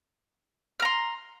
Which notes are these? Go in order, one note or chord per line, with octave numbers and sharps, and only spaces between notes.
A#5 C6 F6